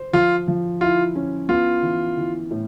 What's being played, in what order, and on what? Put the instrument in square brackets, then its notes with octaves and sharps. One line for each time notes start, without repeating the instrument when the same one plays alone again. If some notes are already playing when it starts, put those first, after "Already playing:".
Already playing: [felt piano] C5
[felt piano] F3 [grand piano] F4
[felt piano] F3
[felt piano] E4 [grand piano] F4
[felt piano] C#4
[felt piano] B3 [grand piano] F4
[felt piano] E3
E3
A2